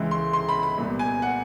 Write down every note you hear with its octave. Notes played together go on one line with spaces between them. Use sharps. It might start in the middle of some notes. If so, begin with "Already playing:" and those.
Already playing: C#2 C#3 E3 G#3
C6
C6
B5
B5
C2 A#2 G3 B3
G#5
F#5